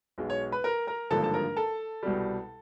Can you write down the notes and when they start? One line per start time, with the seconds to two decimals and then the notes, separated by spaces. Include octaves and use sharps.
0.18 B1 B2 G#3
0.30 C#5 C#6
0.52 B4 B5
0.64 A#4 A#5
0.87 A#4 A#5
1.11 G#1 G2 D3 F3 A#3 A4 A5
1.24 A5
1.34 A#4 A#5
1.57 A4 A5
2.03 C2 B2 G3